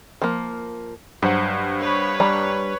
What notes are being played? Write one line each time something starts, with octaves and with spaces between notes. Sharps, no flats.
F3 A#3
G2 F#3 C5 F#5
B4 C#5
G3 D4 A#5